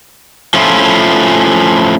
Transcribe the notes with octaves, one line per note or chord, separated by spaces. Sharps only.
F3 A3 C#4 E4 F4